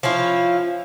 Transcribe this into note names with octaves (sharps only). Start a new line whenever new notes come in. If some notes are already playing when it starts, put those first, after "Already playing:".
F3 C#4 E4 F4